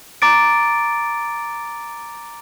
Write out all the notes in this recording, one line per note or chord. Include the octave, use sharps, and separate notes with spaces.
A#5 D6 A6 D7